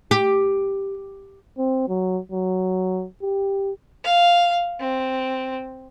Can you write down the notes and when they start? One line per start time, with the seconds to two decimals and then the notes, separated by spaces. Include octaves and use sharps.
0.11 G4
1.58 C4
1.88 F#3
2.32 F#3
3.22 G4
4.05 F5
4.80 C4